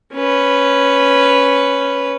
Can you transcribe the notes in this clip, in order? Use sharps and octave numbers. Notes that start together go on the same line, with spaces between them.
C#4 B4